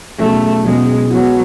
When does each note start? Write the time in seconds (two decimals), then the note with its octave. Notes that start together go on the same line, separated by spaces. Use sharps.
0.19 B2 F#3 A3 C#4 G#4
0.64 B2 F#3 G#3 C#4 G#4
1.10 F#3 G#3 B3 F#4